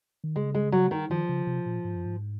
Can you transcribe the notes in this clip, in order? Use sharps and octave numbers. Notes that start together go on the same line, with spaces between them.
D#3
C#3 G#3
G#3
F#3
D#3
D#3 F3
C#3
C3
A#2
G#2
F#2
G#2